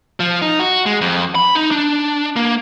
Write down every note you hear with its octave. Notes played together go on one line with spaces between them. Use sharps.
F3
D#4
F#4
G#3
F2
B5
D#4
D4
A#3